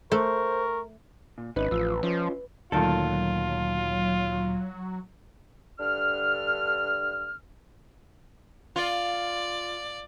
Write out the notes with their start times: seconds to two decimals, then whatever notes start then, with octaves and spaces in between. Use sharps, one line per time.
0.12 A3 A#4 C5 C#6
1.38 A#2
1.56 G#1 C#4 D#4 B4
1.71 A1 F3 F4 E6
2.03 F3 C#4 F4
2.72 D2 A#2 D#3 F#3 F4 A4
5.79 G2 D3 F6
8.76 F4 D5